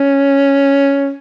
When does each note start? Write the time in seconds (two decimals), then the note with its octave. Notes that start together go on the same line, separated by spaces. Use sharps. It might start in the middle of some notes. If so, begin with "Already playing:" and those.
Already playing: C#4